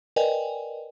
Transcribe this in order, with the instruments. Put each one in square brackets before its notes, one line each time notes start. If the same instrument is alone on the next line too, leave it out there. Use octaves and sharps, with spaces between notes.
[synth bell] A#4 B4 D5 D#5 G5 G#5